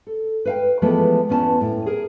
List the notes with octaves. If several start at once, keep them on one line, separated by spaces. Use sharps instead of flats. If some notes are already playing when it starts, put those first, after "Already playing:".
A4
B4 F5 G5
E3 F3 G#3 A3 B3
E2 B3 C#4 G#5 A5
A2
G#4 A#4